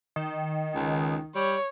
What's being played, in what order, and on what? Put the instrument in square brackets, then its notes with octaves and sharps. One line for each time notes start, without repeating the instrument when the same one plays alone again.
[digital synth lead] D#3
[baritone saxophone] C#2
[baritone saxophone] G3 [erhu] C#5